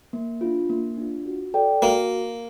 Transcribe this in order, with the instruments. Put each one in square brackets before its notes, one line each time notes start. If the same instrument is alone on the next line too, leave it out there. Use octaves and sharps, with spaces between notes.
[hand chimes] A#3
D4 F4
A#3
D4 F4
F#4
A4 D5 G5
[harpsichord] A#3 [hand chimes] F#4